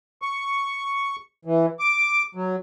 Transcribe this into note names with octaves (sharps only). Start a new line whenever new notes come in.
C#6
E3
D6
F#3